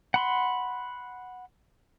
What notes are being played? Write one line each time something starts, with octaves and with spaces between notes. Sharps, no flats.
F#5 B5 C6